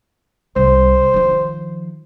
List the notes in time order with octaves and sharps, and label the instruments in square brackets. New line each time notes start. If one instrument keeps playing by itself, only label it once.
[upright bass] C2 [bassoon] C5
[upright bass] D#3 F3